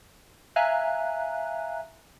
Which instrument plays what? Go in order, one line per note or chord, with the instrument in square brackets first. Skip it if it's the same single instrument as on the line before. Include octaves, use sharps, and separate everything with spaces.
[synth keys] E5 F5 G#5 A#5 F#6